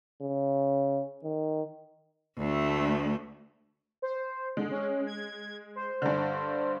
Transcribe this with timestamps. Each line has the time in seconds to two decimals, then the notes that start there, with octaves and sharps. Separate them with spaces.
0.22 C#3
1.24 D#3
2.38 D2 A3
4.02 C5
4.57 D3 G#3
4.71 C#4
5.07 G#6
5.75 C5
6.02 G2 D3